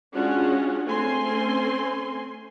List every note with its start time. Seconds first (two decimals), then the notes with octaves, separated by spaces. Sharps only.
0.14 G#3 C#4 D4 F4 F#4 F#5
0.87 A3 C4 C#4 G#5 C6